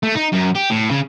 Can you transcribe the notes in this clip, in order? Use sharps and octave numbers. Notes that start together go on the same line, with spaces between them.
A3
D#4
F#2
G4
A2
C#3